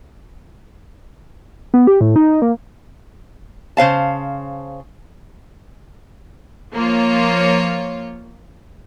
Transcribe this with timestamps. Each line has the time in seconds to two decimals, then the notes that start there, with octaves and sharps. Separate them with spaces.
1.74 B3
1.87 G4
2.01 A2
2.16 D#4
2.42 A#3
3.77 C#3 C5 F5 A5
6.73 F3 A#3 F4 C#5